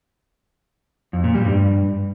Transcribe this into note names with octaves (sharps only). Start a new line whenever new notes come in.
F2
A#2
G3
G2